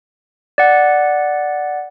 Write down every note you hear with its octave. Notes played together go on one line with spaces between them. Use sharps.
D5 F#5